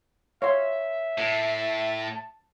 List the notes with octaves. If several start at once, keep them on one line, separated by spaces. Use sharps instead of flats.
C#5 E5 F5 C6
A2 A5